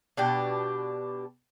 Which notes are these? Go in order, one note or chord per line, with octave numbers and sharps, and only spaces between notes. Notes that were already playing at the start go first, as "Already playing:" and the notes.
B2 D4 G4